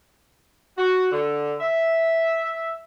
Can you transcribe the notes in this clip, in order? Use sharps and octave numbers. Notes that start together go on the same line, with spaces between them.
F#4
D3
E5